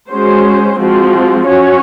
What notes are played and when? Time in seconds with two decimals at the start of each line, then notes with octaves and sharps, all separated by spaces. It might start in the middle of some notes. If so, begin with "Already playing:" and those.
0.09 G#3 C#4 F#4 C5
0.78 F3 G#3 C4 F#4
1.46 C#4 F#4 C#5